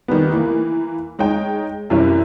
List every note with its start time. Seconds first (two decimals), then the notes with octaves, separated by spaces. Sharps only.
0.08 D#3 G3 B3
0.32 E3 A#3
1.19 G#3 D#4 C#5 G5
1.90 F#2 C3 E3 G3 C#4 E4